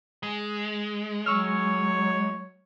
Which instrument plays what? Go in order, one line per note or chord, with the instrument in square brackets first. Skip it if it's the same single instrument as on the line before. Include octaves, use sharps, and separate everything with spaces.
[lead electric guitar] G#3
[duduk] F#3 [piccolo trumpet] C#5 [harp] C#6 E6 F6